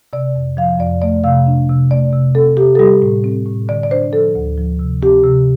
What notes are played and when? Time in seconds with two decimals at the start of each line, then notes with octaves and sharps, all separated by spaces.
0.13 C3 D5
0.35 F2
0.57 F3 F5
0.79 F2 D5
1.02 A3 D5
1.24 C3 F5
1.46 D4
1.69 C3
1.91 A3 D5
2.13 C3
2.35 C4 A4
2.57 C3 G4
2.75 A4
2.79 G3 G4
3.02 A2
3.24 C4
3.46 A2
3.69 D3 D5
3.83 D5
3.91 D4 C5
4.12 F3 A4
4.35 D2
4.58 F3
4.79 C3
5.02 C4 G4
5.24 C3